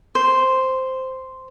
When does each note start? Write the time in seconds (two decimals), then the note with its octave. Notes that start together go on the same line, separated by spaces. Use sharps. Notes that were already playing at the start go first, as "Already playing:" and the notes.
0.15 C5